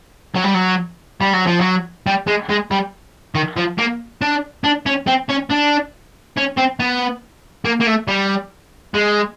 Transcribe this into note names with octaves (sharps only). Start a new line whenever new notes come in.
F#3
G3
F#3
G3
F#3
F3
F#3
G3
G#3
G#3
G3
D#3
F3
A#3
D4
D4
C#4
C4
C#4
D4
C#4
C4
B3
A#3
A#3
A3
G3
G#3